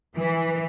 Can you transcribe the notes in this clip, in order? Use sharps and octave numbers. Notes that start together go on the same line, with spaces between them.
E3